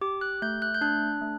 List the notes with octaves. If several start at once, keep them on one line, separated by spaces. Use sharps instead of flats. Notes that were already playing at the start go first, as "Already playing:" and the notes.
G4 D6
F#6
A3 G6
F#6
G6
D4 F#6
A3